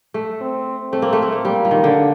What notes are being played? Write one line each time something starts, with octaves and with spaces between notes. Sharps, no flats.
A3
C4
A3 C4
A#3
A3
A#3
A3
G3 A#3
F3
D#3
D3